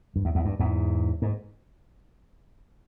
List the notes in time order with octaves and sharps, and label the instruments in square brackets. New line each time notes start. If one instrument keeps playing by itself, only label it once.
[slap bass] G2
E2
E2
G2
E2 G#2
G#2